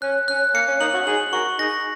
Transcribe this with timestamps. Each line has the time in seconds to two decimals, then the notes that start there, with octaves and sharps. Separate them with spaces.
0.02 C#4 F#6
0.28 C#4 F#6
0.54 A#3 C#7
0.68 C#4
0.80 A#3 D#4 F#7
0.94 C#4 F#4
1.07 D#4 G#4 F#7
1.32 F#4 A#4 C#6
1.59 D#4 G#4 A#6